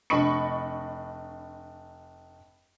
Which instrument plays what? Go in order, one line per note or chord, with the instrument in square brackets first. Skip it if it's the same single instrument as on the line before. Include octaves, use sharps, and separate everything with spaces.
[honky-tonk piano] F1 D4 D#5 B5 C#6 C#7